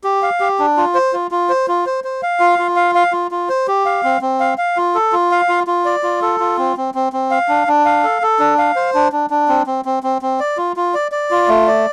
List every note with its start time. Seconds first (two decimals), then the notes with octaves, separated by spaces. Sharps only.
0.04 G4
0.22 F5
0.40 G4
0.59 D4
0.77 F4
0.95 C5
1.13 F4
1.31 F4
1.49 C5
1.68 F4
1.86 C5
2.04 C5
2.23 F5
2.40 F4
2.59 F4
2.76 F5
2.95 F5
3.12 F4
3.31 F4
3.49 C5
3.68 G4
3.85 F5
4.04 C4
4.21 C4
4.40 F5
4.58 F5
4.77 F4
4.95 A4
5.12 F4
5.31 F5
5.49 F4
5.67 F4
5.85 D5
6.03 F4
6.22 A4
6.40 F4
6.58 C4
6.77 C4
6.94 C4
7.13 C4
7.31 F5
7.49 D4
7.68 D4
7.85 F5
8.04 A4
8.22 A4
8.39 D4
8.58 F5
8.76 C5
8.94 D4
9.12 D4
9.30 D4
9.48 C4
9.66 C4
9.85 C4
10.03 C4
10.22 C4
10.40 D5
10.57 F4
10.76 F4
10.94 D5
11.12 D5
11.31 F4
11.48 A3
11.67 D5